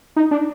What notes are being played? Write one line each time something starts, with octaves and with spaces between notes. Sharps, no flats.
D#4
D4